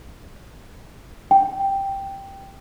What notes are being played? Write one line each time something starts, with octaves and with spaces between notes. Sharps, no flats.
G5